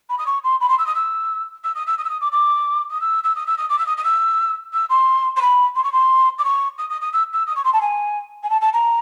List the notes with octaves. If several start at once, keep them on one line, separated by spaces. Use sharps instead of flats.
B5
D#6
C#6
C6
B5
C6
E6
D#6
E6
E6
D#6
E6
D#6
E6
D#6
D6
D6
D#6
E6
E6
D#6
E6
D#6
D6
E6
D#6
D#6
E6
E6
C6
C6
B5
C6
C#6
C6
D6
C#6
D#6
D#6
D#6
E6
E6
D#6
C#6
C6
A5
G#5
G#5
A5
A5
A#5